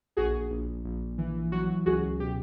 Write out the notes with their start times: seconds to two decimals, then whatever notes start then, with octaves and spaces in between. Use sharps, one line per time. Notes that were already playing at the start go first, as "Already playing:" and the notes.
0.17 A#1 F#4 G#4
0.51 A#1
0.84 A#1
1.18 E3
1.52 F#3 F#4
1.86 C#2 F#4 G#4
2.19 B2 G4